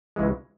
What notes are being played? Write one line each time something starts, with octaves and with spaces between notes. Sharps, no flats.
C#2 C#3 E3 G#3